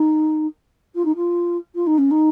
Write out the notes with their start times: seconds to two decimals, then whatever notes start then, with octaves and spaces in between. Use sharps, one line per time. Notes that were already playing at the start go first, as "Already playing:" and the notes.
Already playing: D#4
0.95 F4
1.05 D#4
1.15 F4
1.74 F4
1.86 D#4
1.98 C#4
2.10 D#4